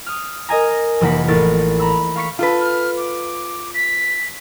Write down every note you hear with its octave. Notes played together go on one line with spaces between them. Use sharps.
D#6 F6
A#4 D#5 G#5 A#5
F1 E3 A#3 E4 F#5 B6
A1 E4 A#4 A6
A#5 B5 E6
F5 C#6 B6 C#7
F4 A4 B4
F6
D6
B6